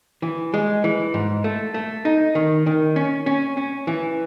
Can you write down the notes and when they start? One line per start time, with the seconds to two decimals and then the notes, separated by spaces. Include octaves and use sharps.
0.22 E3
0.54 G#3
0.84 E3
1.14 G#2
1.44 A3
1.74 A3
2.05 D#4
2.35 D#3
2.66 D#3
2.96 C#4
3.26 C#4
3.57 C#4
3.87 E3